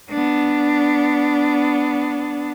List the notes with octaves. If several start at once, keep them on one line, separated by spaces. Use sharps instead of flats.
B3 D4